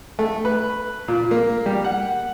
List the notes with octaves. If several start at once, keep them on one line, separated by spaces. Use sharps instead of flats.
A3
B4
A#2
A#3
G3
F#5